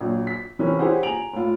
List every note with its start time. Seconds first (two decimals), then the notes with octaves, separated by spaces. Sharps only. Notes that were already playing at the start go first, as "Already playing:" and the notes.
0.01 A#1 F#3
0.27 B6
0.59 C3 E3 C#4 A#4
0.79 E4 G4 G#4 C5 C#5 F#5
1.03 G#5 A#5 D7 F7 F#7
1.33 A2 F4